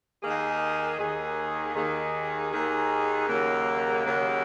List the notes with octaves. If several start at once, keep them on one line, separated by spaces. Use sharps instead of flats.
D#2 D#3 A#3 D#4 G#4
D#2 D#3 A#3 D#4 G#4
D#2 D#3 A#3 D#4 G#4
D#2 D#3 A#3 D#4 G#4
D#2 C#3 F#3 A#3
D#2 C#3 F#3 A#3